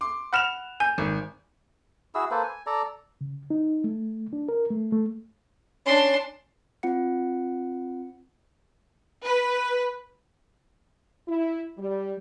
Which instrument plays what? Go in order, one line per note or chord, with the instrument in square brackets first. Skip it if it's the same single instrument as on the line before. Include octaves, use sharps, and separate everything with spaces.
[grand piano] C6 D6
[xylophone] F#5 B5 F6 [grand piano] F#6 E7 F7
[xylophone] G#5 [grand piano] G6
[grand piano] G#1
[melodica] E4 F#4 G#4 E6
A#3 A4 B4 C5
G#5
A4 D5 A#5
[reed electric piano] C#3
D#4
A3
D4
A#4
A3
A3
[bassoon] C#4 [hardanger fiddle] D4 C6
[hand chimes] C4 F4 F#5 C#7
[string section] B4
[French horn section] E4
G3